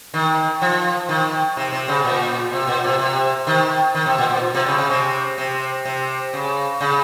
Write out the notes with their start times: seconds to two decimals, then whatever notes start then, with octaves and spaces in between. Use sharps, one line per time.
0.14 D#3
0.62 F3
1.09 D#3
1.57 C3
1.72 C3
1.88 C#3
2.04 A#2
2.52 C3
2.67 A#2
2.84 C3
2.99 C3
3.47 D#3
3.95 D#3
4.06 C3
4.18 A#2
4.30 A#2
4.55 C3
4.66 C#3
4.78 C#3
4.90 C3
5.38 C3
5.85 C3
6.33 C#3
6.81 C#3